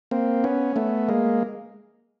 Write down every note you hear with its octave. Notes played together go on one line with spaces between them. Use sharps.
A#3 C4
B3 C#4
A3 B3
G#3 A#3